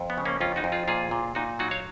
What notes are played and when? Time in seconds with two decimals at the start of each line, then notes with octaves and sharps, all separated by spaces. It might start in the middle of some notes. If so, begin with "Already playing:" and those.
Already playing: F2
0.10 B3
0.18 C#3
0.25 A#3 C#4
0.41 F2 C#4 F4
0.56 D#4 F#4
0.64 F2
0.72 F4 G#4
0.88 A#2 F4 G#4
1.11 A#2
1.35 A#2 D#4 F#4
1.59 F#3 D#4 F#4
1.71 C#5 F5